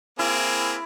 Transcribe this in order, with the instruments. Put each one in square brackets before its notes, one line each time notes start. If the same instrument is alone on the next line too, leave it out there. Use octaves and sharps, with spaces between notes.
[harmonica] A#3 C4 G#4 [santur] E4